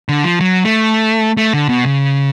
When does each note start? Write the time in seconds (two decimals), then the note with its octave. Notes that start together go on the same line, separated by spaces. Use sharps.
0.09 D3
0.24 F3
0.41 F#3
0.65 A3
1.37 A3
1.54 D3
1.69 B2
1.86 C#3